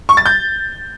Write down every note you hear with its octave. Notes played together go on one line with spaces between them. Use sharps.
C#6
A6
G6